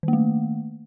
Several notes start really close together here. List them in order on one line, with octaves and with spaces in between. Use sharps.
D#3 A#3 A3